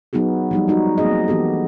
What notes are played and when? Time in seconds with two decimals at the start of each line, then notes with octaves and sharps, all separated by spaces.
0.13 F#3 B3 D#4 F#4 G#4
0.51 F3 G3 D#4
0.68 G#3 D#4 F#4
0.98 F#3 A#3 C4 G#4 D#5
1.28 E3 B3 G4 A4